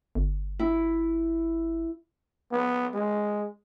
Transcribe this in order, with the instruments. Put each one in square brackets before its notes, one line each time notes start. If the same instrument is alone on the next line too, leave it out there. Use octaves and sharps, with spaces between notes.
[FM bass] G1
[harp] E4
[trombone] B3
G#3